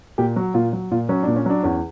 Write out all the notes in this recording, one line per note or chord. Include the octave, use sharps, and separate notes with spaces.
A#2 G4
F#3 F#4
A#2 F4
F#3
A#2 F4
F#3 C#4
A#2 D4
C#4
F#3 D4
E2 C#4